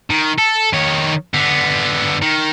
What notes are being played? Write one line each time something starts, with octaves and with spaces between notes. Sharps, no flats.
D#3
A4
D#3 C#5
D3 B3
D#3